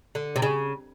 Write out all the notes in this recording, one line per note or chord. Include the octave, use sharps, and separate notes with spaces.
D3
C3
C#3